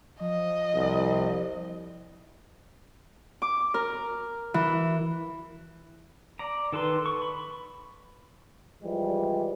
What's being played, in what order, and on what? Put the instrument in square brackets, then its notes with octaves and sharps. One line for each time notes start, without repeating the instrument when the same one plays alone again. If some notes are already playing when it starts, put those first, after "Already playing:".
[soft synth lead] F3 [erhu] D#5
[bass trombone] C2
[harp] D6
A#4
E3
[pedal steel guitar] D5 A#5
D#3 A4 B4 C6
C#6
B5
[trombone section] E3 F3 G3 G#3